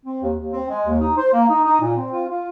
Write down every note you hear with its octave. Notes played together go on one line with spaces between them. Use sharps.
C4
D#2
D#2
C4
G#3
D#2
D#4
C5
A#3
D#4
D#4
A#2
C4
F4
F4